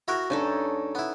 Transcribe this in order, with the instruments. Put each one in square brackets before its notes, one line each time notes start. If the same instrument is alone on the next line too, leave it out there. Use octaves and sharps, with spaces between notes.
[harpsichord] E4 F#4 A#4
[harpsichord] G2 [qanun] C#4 D#4 A4
[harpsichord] B3 E4